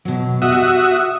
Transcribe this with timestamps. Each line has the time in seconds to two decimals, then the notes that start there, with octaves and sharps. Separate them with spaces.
0.05 B2 F#3
0.42 F#4 G4 D#5 E5 D#6